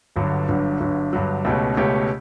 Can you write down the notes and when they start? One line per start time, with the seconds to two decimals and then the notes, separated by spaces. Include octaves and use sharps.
0.16 G1 G2 D3 F#3
0.48 G1 G2 D3 F#3
0.80 G1 G2 D3 F#3
1.13 G1 G2 D3 F#3
1.45 C#2 B2 A3 C#4 G4
1.77 C#2 B2 A3 C#4 G4